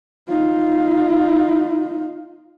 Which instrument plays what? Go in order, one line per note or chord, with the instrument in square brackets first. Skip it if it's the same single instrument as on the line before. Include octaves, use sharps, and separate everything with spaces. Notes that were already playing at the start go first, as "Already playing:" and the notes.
[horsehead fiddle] D#4 F4